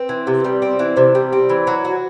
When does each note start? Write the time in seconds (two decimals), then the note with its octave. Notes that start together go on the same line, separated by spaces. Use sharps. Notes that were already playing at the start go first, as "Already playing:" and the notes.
Already playing: C4 B4
0.09 E3
0.27 C3
0.44 G3
0.62 C4
0.79 E3
0.97 C3 C5
1.15 G3
1.33 C4
1.49 E3
1.67 F#3
1.85 F#4